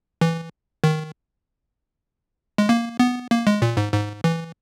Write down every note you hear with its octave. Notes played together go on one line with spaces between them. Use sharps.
E3
D#3
G#3
A#3
B3
A#3
G#3
A#2
G#2
G#2
E3